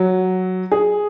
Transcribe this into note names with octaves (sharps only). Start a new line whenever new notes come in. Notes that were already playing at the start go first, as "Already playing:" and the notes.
Already playing: F#3
G#4